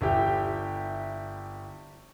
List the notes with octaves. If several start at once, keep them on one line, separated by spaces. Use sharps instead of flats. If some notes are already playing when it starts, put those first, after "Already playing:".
G1 E4 G4 G6